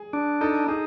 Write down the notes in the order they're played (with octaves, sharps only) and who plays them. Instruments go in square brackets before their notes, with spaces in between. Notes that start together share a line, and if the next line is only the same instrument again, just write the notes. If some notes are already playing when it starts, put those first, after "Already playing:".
Already playing: [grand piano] G#4
[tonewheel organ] D4
[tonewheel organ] D#4 [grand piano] A4
[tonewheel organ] D#4 [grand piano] G#4